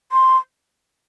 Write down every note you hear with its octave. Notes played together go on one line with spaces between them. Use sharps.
C6